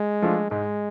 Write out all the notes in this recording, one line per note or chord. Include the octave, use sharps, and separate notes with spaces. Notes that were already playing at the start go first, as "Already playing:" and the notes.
Already playing: G#3
F3 A3 D4 F4
G#2 G#3